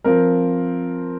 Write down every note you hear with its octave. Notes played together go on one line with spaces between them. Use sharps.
F3 C4 A#4